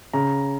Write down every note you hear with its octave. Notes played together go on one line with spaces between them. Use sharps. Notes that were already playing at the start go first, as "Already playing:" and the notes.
C#3 A#5